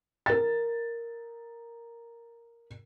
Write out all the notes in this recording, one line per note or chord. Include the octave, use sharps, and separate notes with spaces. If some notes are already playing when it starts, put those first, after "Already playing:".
A#4 A6